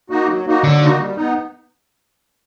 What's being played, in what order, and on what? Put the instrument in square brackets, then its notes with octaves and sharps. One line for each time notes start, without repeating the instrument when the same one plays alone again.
[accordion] A#3 D#4 F#4
F#3
A#3 D#4 F#4
[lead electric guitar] D3 [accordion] F#3
[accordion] A#3 D#4 F#4
G3
B3 D#4